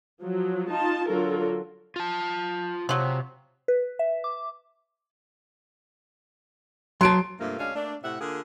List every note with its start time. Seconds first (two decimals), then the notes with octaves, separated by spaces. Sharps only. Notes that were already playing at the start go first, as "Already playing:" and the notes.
0.22 F3 F#3
0.71 D#4 F4 A5
1.09 D3 F#3 F4 A4 A#4
1.96 F4 A5
2.89 C3 F3 F#3
3.68 B4
3.99 E5
4.24 D6
7.01 F#3 A5 C6 D7
7.40 G2 C3 A3 A#3 F4
7.59 D2 G#3 C#4 D4 F5
7.75 A3 A#3 D4
8.03 A2 C3 E5 F#5
8.21 D3 A#3 F4 G#4